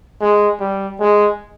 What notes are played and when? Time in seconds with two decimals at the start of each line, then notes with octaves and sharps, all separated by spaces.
0.21 G#3
0.60 G3
1.00 G#3